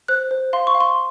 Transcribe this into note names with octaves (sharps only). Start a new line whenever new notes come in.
C5 F#6
C5
F5 C6
C#6
F5
C6